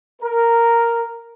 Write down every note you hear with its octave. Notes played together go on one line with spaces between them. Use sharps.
A#4